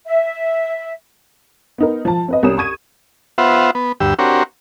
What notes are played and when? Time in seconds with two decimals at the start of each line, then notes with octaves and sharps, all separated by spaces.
0.04 E5
1.78 B3 D#4 A#4
2.05 F3 A5
2.28 C4 B4 D#5
2.43 C2 C#4 D#6 E7
2.58 C#6 D#6 G#6 D#7
3.38 B3 F4 C5 E5 F#5
3.75 B3
4.00 D2 G2 G4 E6
4.19 C4 D4 F#4 G4 A#4 C#5